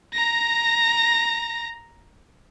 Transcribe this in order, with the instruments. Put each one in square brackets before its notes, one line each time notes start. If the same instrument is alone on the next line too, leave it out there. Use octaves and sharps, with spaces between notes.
[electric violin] A#5 A#6